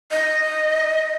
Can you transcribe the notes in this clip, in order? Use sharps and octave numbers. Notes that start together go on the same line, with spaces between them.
D#5